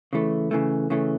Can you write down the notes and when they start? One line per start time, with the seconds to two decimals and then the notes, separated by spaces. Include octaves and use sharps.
0.13 C#3 E3 A3
0.51 C#3 E3 A3
0.90 C#3 E3 A3